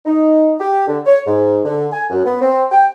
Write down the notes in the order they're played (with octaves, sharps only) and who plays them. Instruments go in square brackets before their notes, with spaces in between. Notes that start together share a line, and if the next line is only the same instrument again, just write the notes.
[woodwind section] D#4
G4
D3
C#5
G#2
D3
G#5
F#2
B3
C4
G5